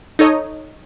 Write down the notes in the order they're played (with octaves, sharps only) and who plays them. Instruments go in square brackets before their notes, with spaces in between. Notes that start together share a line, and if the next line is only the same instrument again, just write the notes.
[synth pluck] D#4 A4 C#5 D#5